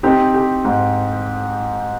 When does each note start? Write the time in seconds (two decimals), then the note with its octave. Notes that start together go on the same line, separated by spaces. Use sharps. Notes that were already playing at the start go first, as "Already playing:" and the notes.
0.03 C4 D#4 G4
0.34 G4
0.65 G#2